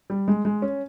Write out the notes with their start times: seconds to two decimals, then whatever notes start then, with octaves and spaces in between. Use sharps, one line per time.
0.10 G3
0.28 G#3
0.45 G#3
0.62 C#4